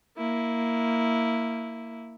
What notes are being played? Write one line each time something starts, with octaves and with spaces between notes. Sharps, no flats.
A#3 E4